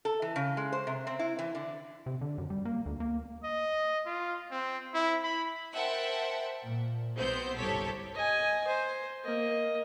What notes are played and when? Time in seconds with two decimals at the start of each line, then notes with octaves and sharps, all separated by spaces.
0.05 A4
0.22 E3
0.36 C#3
0.57 G#3
0.72 C5
0.87 C3
1.07 C4
1.19 E4
1.39 E3
1.55 D3
2.06 C3
2.21 D3
2.38 F#2
2.50 G3
2.65 A#3
2.86 D2
3.00 A#3
3.44 D#5
4.06 F4
4.51 C4
4.94 E4
5.24 B5
5.75 A#4 C5 E5 F#5 G5 A5
6.62 A#2
7.17 B1 B3 C4 C5 G6
7.57 G1 C2 G4 A4 C#5 B6
8.14 D#5 G#5
8.67 C5
9.24 A#3 D#5